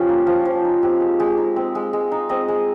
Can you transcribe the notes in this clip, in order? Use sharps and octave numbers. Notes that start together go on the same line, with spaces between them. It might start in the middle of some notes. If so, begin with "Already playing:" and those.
Already playing: F3 C#4 F4 G4
A#3
F3
F3
D#4
C4 G4
G#3
G#3
D#4
C4
G#3
G#3
D#4
C4 D#5
G#3